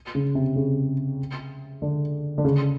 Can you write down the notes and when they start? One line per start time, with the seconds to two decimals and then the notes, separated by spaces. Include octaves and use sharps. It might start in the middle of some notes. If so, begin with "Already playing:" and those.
0.15 C#3
0.35 C3
0.56 C#3
1.82 D3
2.38 D3
2.45 C#3